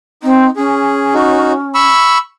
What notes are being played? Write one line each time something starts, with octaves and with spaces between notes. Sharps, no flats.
C4 D#4
C#4 G#4
D#4 F#4
B5 C#6 E6